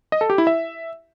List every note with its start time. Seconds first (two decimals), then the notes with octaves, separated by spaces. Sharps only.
0.12 D#5
0.21 A4
0.30 G4
0.38 E4
0.47 E5